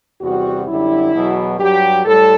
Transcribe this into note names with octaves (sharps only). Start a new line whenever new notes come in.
E2 C3 G3 F#4
F#2 D3 G3 E4
E2 B2 F#3
G2 F#3 G4
A2 G3 A4